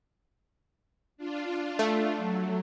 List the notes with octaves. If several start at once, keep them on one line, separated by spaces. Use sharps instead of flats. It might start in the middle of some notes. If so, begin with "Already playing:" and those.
D4 F4
A3
F#3